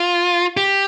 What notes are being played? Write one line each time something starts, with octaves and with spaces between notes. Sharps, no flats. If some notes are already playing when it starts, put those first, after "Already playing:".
Already playing: F4
G4